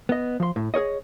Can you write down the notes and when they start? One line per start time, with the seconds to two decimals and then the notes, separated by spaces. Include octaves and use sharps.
0.09 B3 D#5
0.40 F3 C6
0.56 A2
0.74 G#4 A#4 C#5 D#5